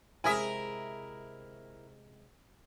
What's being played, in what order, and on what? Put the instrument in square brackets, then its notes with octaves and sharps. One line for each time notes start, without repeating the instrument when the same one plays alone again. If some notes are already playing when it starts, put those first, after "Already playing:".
[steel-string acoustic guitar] C3 G#3 [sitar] E4 A#4 E5 [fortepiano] G#5 D#6